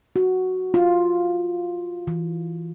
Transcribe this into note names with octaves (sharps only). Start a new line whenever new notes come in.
F#4
F4
E3